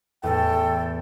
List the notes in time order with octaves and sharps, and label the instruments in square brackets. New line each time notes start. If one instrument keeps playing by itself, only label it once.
[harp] E2 A2 [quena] A4 [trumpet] G5